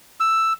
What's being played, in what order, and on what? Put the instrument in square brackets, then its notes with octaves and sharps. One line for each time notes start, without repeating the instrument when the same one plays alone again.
[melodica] E6